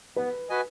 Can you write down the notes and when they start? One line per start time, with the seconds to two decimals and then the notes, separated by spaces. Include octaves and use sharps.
0.16 B3 B4
0.50 F#4 B4 D#5 G#5